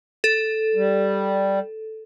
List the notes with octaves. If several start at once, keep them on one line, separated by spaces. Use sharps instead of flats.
A4
G3